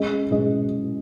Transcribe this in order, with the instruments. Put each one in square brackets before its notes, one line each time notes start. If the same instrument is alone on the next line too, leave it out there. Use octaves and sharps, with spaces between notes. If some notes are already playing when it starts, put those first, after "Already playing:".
Already playing: [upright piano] G#3 C#4 G#4 D#5
G#3 C#4 G#4 D#5